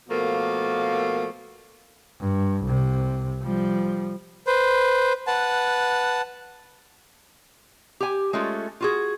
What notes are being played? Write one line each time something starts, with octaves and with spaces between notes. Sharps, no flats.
B2 F3 A3 A#3
G2
C2 C3
F3 G3
B4 C5
B4 F#5 A5
G4 G#5
G#3 A3 C#4 F4
F4 F#4 G#4